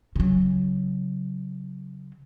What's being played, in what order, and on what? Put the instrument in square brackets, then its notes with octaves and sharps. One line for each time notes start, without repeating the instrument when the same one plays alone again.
[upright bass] C#3 F#3